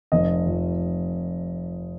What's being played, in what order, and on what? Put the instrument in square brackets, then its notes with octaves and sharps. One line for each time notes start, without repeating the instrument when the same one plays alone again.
[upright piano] F1 D#5
F2